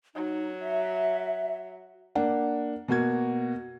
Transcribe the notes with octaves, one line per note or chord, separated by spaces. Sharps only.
F#3 D#4
E5
A#3 D4 F#5
B2 A#3 F#4 G#6